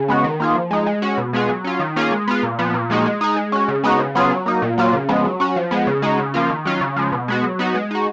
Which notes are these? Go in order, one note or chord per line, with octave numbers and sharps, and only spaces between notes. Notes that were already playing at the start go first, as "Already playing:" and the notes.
Already playing: C#3
G#3 B3 F#4
D#3
A#3 F4 G#4
F3
G#3 D#4
G#3
C#4 F#4
B2
G#3 B3 F4 G#4
F#3
C#4 F4
D#3
A#3 C#4 F4 G#4
G#3
B3 F4
A#2
F3 B3
A#2
F3 G#3 D#4 F#4
G#3
D#4 G#4
G#3
C#4 F#4
C#3
G#3 B3 D#4 F#4
C#3
F#3 B3 F4 G#4
F#3
A#3 D#4
A#2
F#3 A#3 F4
C#3
F3 G#3 B3
F#3
C#4 F#4
F3
G#3 B3
C#3
G#3 D#4 F#4
C#3
F3 A#3 F4
D#3
F#3 C#4 F4
C#3
F3 G#3
B2
G#3 B3 F#4
F#3
B3 D#4 F#4
G#3
D#4 F#4